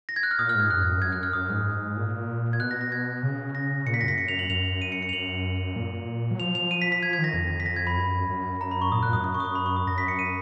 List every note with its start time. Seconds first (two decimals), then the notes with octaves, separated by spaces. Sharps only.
0.09 A#6
0.16 G#6
0.23 F#6
0.31 F6
0.39 A#2 D#6
0.49 F6
0.55 G#2 G#6
0.70 F#2 F#6
0.81 F2
0.92 F#2
1.02 G#6
1.13 F#6
1.23 F6
1.33 F#2 D#6
1.50 G#2
1.97 A#2
2.53 G#6
2.60 B2 F#6
2.71 A#6
2.81 A#6
2.92 G#6
3.23 C#3
3.55 A#6
3.86 A#2 C#7
3.94 B6
4.01 F#2 A#6
4.08 B6
4.18 C#7
4.28 F7
4.39 F#7
4.50 F#2 F7
4.82 D#7
4.92 C#7
5.03 C#7
5.09 F7
5.13 F#2 F#7
5.76 A#2
6.31 F#3
6.39 F3 F7
6.55 F7
6.71 D#7
6.82 B6
6.92 B6
7.03 F3 G#6
7.13 G#6
7.19 D#3
7.24 A#6
7.34 F2
7.60 B6
7.66 A#6
7.76 G#6
7.87 B5
7.97 F#2
8.29 F#2
8.61 A#5
8.71 B5
8.82 C#6
8.92 A#2 D#6
9.02 A#2 F#6
9.13 F#2 D#6
9.24 D#6
9.34 C#6
9.40 D#6
9.45 C#6
9.55 B5
9.66 C#6
9.76 D#6
9.87 F#2 A#6
9.98 B6
10.08 C#7
10.19 D#7